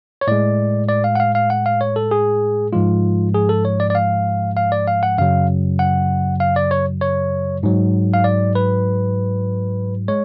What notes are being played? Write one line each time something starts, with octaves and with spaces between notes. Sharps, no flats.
C#5
A2 G#3 D5
D5
F5
F#5
F5
F5
F#5
F5
C#5
A4
G#4
G#2 F3 G#3 F4
G#4
A4
C#5
D5
D5
F5
F5
D5
F5
F#5
F#2 C#3 F#3 F5
F#5
F5
D5
C#5
C#5
G#2 F#3
F5
D5
B4
G#3 C#5